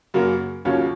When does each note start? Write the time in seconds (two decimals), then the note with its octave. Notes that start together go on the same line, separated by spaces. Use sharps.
0.14 F#2 C#3 F#3 A#3
0.65 D#2 C#3 F#3 C#4 F4